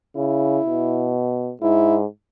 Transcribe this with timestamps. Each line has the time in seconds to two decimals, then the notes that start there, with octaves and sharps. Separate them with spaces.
0.16 C#3 E4
0.66 B2
1.62 G#2 E4